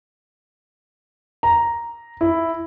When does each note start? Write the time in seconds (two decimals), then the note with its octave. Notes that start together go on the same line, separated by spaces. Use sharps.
1.43 A#5
2.21 E4